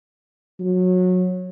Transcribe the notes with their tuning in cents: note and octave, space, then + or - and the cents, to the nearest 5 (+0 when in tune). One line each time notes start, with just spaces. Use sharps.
F#3 -20